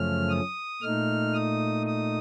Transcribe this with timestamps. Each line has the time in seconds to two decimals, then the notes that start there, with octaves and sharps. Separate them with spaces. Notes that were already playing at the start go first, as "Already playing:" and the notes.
Already playing: F#2 C#3 F3 A3 C#4 F6
0.29 D#6
0.82 A#2 A3 D#4 F6
1.34 D#6
1.87 D#6